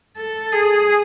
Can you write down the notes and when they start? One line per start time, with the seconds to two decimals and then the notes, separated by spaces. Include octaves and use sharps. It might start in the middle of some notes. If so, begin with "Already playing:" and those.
0.17 A4
0.52 G#4